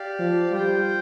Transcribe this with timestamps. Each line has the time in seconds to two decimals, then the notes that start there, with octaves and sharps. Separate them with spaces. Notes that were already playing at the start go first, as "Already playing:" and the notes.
Already playing: G4 D5 F5
0.19 F3
0.52 G3 F4 C5 G5